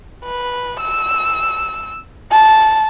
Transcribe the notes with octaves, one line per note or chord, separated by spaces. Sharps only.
B4
E6
A5